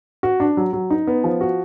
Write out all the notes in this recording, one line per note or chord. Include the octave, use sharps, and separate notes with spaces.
F#4
D4
F#3
F#3
D#4
B3
F3
F#4